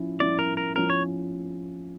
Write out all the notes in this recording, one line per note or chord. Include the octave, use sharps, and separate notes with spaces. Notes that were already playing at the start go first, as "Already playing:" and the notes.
Already playing: F3 C#4 E4
F3 C#4 E4 D5
A#4
A#4
F3 C#4 E4 A#4
C#5